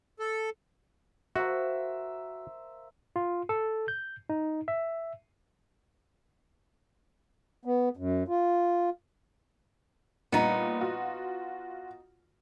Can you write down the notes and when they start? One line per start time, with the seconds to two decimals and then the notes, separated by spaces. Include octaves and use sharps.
0.19 A4
1.36 F#4 A#4 C5 E5 F5
3.16 F4
3.49 A4
3.88 G6
4.29 D#4
4.68 E5
7.65 B3
7.97 F#2
8.28 F4
10.32 A#2 G3 B3 D#4 C#7
10.81 F4 F#4